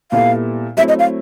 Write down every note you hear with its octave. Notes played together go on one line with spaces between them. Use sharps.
A#2 G3 B3 E4 A4 F5
F#3 A3 C4 E4 E5
D#5
F5